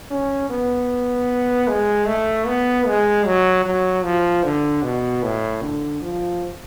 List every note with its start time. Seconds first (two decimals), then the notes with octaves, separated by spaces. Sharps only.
0.11 C#4
0.50 B3
1.68 G#3
2.07 A3
2.47 B3
2.87 G#3
3.26 F#3
3.65 F#3
4.04 F3
4.44 D3
4.83 B2
5.23 A2
5.62 D3
6.01 F3